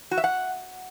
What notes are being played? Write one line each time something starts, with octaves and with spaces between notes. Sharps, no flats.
F#4
E5
F#5